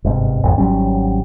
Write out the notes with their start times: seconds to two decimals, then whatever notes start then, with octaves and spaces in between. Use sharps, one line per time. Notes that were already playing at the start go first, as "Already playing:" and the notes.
0.04 G1 G#2 C3
0.43 G#1 F2
0.58 G#1 F#3 G3 C#4